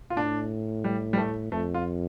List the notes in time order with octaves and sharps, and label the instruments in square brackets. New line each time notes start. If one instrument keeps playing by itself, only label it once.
[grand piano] F4
[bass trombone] A2 [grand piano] D4
[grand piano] G3
G3
A3
[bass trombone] F2 [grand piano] A3
[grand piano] F4